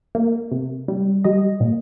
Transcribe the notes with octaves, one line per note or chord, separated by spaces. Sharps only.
A#3
C3
G3
G3 D#5
A#2